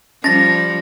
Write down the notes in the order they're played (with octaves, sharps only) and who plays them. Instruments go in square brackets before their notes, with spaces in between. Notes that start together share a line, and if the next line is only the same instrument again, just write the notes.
[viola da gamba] F3 G3 [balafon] C#4 [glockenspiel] A6 A#6